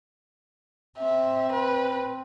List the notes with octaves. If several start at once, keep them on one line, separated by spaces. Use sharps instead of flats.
C4 E5
B4